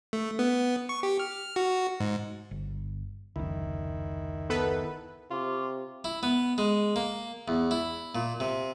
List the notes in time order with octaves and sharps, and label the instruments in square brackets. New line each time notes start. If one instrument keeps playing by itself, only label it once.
[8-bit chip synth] A3
B3
C#6
G4
F6
F#4
G#2
[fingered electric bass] G1
[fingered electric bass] F1 C#2 [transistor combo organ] D#3 E4
[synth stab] B3 A4 B4
[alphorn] C3 [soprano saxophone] F4 [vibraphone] C#6 D6
[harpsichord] E4
B3
G#3
A#3
E2
E4
A#2
C3